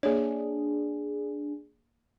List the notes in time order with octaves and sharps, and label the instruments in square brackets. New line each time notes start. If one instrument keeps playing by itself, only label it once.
[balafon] A#3 C#5 [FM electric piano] D4 G#4